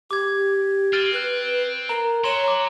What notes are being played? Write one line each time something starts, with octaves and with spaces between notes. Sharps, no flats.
G4 D6 G#6
C4 F6 A6 D#7
B4 F#6 A6
A#4 A#5
F#3 C#5 C6 E7
A#5 D6